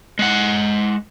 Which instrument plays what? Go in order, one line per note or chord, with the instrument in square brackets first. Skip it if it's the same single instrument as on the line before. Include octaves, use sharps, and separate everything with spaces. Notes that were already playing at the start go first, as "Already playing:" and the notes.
[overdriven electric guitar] G#3 F#5